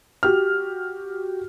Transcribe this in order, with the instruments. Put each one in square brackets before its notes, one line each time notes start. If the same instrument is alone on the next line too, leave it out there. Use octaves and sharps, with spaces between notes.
[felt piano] F#4 G4 F6